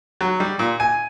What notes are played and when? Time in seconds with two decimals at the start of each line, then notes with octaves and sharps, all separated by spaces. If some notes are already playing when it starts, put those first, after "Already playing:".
0.21 F#3
0.40 G3
0.59 A#2
0.80 G#5